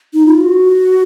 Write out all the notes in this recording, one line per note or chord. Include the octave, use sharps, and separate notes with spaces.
D#4
F4
F#4